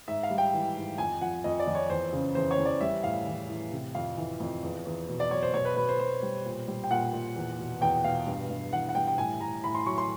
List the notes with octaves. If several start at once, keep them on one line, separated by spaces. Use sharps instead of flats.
G#2 E5
F5
G3
G5
E3
G#2
F2 G#5
F3 F#5
F2 D#5
D5
F2
C#5
E2 C5
C#3
E2 C5
C#5
E2
D5
G3 E5
A2 F5
E3
A2
C3
F2 F5
E3
F2
E2
E2
B2
D5
F#3 C#5
C5
B2 C#5
B4
B2 B4
C5
B2 C5
G3
A#2
G3
G5
A#2 F#5
A#2
E2
B2
E2 G5
B2 F5
G2
G2
E3 F#5
F#5
G3 G5
G5
A2 G#5
A2 A#5
A2 B5
C6
F#3 C#6
C6